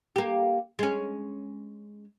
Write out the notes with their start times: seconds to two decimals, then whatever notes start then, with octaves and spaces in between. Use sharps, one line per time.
0.16 A#3 G4
0.79 G#3 C#4